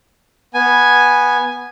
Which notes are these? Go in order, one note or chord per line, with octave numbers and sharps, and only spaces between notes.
B3 G#5